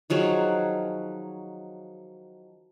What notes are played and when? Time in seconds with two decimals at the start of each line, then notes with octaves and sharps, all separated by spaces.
0.10 D#3 F3 F#3 G#4